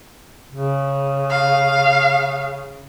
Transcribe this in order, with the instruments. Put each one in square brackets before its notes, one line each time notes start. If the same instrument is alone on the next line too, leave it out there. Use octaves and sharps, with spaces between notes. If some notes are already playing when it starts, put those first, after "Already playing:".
[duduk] C#3
[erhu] F5